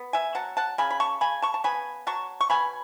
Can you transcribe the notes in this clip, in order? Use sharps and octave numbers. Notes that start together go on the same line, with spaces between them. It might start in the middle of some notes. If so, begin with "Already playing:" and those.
Already playing: B3
E5 G#5
F#3 F#5 A5
F#5 A5
C#3 G#5 B5
B5
A5 C#6
C#3 G#5 B5
A5 C#6
A5
B3 G#5 B5
F#3 A5 C#6
C#6
B2 G#5 B5